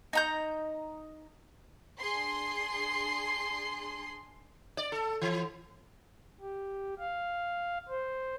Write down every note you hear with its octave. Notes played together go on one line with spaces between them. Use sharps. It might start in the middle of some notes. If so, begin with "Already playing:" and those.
D#4 A#5 G6
D4 G#4 C6 C7
D5
A4
E3
G4
F5
C5